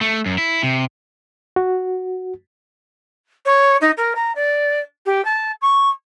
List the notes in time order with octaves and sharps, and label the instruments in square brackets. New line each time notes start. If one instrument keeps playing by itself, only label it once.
[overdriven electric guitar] A3
F#2
E4
C3
[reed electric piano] F#4
[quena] C#5
D#4
A#4
A#5
D5
G4
A5
C#6